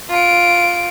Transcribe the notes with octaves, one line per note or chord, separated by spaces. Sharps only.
F4 D7